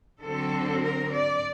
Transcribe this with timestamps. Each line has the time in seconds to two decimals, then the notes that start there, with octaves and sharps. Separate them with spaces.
0.22 D3 F#3 C4 A4
0.83 A#4
1.14 D5